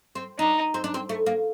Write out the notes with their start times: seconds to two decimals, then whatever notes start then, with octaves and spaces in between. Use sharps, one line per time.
0.15 C4
0.38 D4 D#4
0.74 C4
0.84 D4
0.94 C4
1.09 A3
1.26 A#3